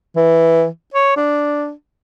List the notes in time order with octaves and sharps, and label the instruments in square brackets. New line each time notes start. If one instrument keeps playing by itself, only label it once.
[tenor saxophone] E3
C#5
D4